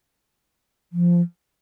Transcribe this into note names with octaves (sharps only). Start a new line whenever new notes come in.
F3